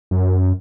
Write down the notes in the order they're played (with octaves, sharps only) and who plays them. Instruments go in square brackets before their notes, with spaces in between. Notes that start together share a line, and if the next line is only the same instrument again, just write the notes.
[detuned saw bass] F#2